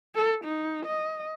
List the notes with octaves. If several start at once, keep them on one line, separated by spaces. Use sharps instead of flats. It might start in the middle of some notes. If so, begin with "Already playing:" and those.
A4
D#4
D#5